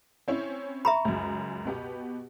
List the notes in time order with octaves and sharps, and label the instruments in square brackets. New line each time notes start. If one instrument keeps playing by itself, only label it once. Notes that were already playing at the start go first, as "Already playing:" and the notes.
[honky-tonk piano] C4 C#4 E4
[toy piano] E5 A#5 B5 [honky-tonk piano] C#6
[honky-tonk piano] C#2 F#2
B2 B3 G4